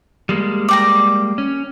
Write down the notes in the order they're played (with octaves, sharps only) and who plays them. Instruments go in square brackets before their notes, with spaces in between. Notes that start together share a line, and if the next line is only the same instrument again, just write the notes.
[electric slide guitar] G3 G#3 A#3
[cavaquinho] D5 G5 A#5
[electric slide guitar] C#4